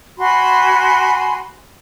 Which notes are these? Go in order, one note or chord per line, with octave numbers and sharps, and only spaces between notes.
F#4 G#5 B5 C6